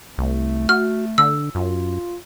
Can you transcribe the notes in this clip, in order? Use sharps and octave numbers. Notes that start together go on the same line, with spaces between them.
C2 A3
F#4 F6
D3 E6
F#2 F4